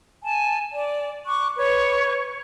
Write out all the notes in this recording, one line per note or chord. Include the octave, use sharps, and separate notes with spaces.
G#5 A5
D5
C#6 D6 F#6
B4 C#5 C#6